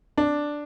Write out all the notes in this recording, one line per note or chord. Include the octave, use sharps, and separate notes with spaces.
D4